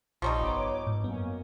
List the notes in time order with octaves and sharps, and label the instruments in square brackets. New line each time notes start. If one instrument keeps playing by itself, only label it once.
[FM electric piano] A#1 C#6 [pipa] F3 G3 D#4
[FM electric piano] G1 [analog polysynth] B3 C#5 D6
[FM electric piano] G#2
[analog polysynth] F#2 A#3 C#4 [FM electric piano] B3